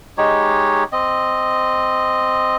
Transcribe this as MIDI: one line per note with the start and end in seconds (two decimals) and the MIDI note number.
0.18 0.84 56
0.18 0.84 63
0.18 0.84 67
0.18 0.84 73
0.92 2.57 60
0.92 2.57 75